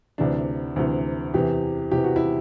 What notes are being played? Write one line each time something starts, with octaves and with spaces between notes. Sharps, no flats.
D2 C3 E3 D4
D2 C3 E3
E2 C3 E3 G4
E2 C3 E3 G4
F#4
E4